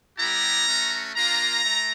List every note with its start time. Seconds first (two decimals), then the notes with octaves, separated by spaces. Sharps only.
0.18 G3 B3 E4 G4 A#5
0.67 A3 C#4 F#4
1.15 A#3 D4 F4 A#5
1.64 A3